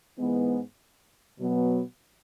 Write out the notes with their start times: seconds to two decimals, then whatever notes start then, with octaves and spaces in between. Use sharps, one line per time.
0.18 G#2 E3 G#3 B3
1.39 B2 F#3 B3